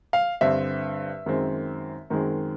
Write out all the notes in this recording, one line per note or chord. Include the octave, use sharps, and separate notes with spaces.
F5
G2 D3 G3 C4 E5
F#2 D#3 G#3 C4
F#2 D#3 G#3 C4